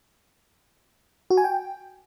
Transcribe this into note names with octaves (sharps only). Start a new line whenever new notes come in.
F#4
G#5
G5